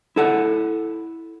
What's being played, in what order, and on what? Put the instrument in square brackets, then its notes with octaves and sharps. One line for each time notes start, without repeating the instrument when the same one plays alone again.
[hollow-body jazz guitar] E4 A4 F#5